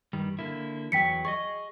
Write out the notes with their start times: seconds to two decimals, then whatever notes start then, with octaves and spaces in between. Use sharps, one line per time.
0.13 G2 D#3 G3
0.39 D3 A#3 E4
0.92 E2 F#3 G5 B6 C#7
1.25 G#4 D5 D#5 C#6